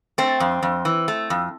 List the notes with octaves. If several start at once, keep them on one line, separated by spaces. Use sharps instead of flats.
A3 C4
F2
F2
E3
A3
F2